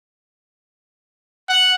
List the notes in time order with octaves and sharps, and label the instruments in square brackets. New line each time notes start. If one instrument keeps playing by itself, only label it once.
[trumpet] F#5